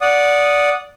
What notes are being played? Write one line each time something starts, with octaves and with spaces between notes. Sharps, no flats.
D5 F#5 D#6